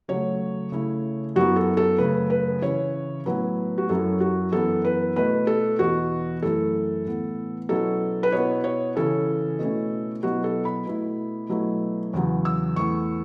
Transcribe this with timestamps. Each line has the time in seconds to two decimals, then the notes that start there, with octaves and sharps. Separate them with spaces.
0.08 C#3 F#3 A3 C#5
0.72 C#3 A3 E4
1.36 F#2 F#3 B3 E4 F#4
1.56 A4
1.77 A4
1.98 F#2 C#3 A3 B4
2.30 B4
2.62 C#3 E3 C#4 E4 C#5
3.26 A2 F#3 B3 E4 B4
3.78 F#4
3.89 F#2 F#3 C#4 E4 A4
4.20 F#4
4.52 F#2 E3 B3 E4 A4
4.85 B4
5.16 B2 A3 E4 B4
5.47 A4
5.79 E2 B2 B3 E4 F#4
6.42 F#2 E3 A3 E4 A4
7.05 A2 E3 B3
7.69 B2 F#3 C#4 E4 A4
8.23 B4
8.32 B2 B3 E4 C#5
8.64 C#5
8.96 C#3 E3 C#4 A4
9.59 B2 A3 C#4 E4
10.23 B2 F#3 B3 E4 F#4
10.44 A4
10.65 B5
10.87 B2 A3 E4
11.49 B2 F#3 A3 E4
12.14 E2 C#3 F#3
12.45 E6
12.76 E2 E3 A3 C#6